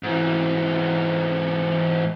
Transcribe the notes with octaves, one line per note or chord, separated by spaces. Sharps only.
G#2 E3